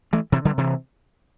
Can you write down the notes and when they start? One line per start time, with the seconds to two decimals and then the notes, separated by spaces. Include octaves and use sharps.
0.13 E3 A3
0.32 C3 E3
0.45 D3 G3
0.58 C3 E3